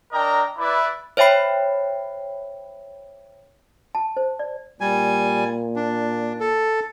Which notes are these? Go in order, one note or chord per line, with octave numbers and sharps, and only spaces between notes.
D4 A#4 D5 D#5 G5 A#5
E4 B4 D5
C5 C#5 E5 G5 B5 C7
A5
C5
D5
A#2 G3 G#5
D4
A4